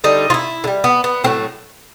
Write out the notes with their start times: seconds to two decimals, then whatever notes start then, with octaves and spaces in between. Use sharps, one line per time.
0.04 D3 G3 D#4
0.30 F4
0.34 E4
0.64 D3
0.67 G3
0.84 B3
1.04 B3
1.24 A2 F#3 A3 C4